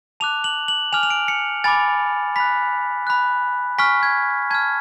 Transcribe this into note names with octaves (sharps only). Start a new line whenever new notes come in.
A5 D6 F#6 F7
F#7
F#7
G#5 D6 F6 F7
F7
D7
C#7
G#5 B5 D6 A6
B5 F#6 B6
B5 F#6
G#5 C#6 F6 B6
G#6
A5 C#6 F6 G#6